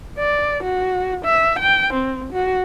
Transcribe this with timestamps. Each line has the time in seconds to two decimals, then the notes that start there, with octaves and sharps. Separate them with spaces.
0.19 D5
0.64 F#4
1.25 E5
1.60 G5
1.94 C4
2.33 F#4